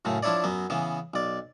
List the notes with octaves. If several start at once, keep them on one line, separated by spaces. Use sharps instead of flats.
F#2 A2 C#3 A3
F3 D4 E4 C#5 D5
F#2 F#3 B3
C#3 E3 B3
B1 D5